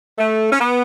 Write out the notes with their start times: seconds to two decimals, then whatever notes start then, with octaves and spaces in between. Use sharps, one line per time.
0.19 A3
0.51 C#4
0.59 B3